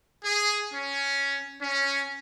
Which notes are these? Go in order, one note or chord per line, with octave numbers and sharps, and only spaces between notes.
G#4
C#4
C#4